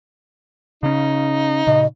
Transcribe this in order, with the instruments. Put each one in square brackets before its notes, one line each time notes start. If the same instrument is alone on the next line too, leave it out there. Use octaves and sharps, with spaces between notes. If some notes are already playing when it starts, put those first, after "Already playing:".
[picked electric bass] C#3 C#4 [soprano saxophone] D#4
[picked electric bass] A#2 C#3 [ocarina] D#5